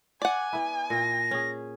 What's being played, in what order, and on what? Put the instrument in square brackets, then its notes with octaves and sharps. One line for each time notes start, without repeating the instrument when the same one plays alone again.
[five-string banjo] D5 F#5 [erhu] G#5
[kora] B3 E4
[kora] A#2 [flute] A#6
[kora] C#4 G#4